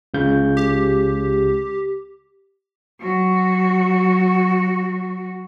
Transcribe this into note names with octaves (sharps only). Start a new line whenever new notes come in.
C#2 C#3 G6
G4
F#3 F#4